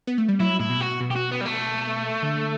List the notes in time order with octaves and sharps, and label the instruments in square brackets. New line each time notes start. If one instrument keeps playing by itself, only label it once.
[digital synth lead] B3
A3
G3
[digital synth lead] F#3 [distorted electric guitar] E4
[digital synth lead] A2 [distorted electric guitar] E4
[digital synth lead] B2
[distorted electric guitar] F#4
[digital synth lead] B2
[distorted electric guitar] G4
F#4
B3
G3
A3
[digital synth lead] D3